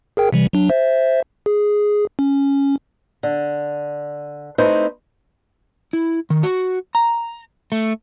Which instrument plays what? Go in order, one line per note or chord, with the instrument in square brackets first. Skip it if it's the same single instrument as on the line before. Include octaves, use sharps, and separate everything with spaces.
[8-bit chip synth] G#4 A#4 G5
C3 E3 G3
F#3 D4
C5 E5
G#4
C#4
[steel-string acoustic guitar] D3
A3 C4 D#4 E4 B4 C5
[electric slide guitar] E4
D#3
F#4
A#5
A3